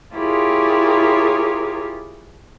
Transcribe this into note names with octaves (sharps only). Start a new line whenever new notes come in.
E4 F4 G4 G#4 A#4 C#5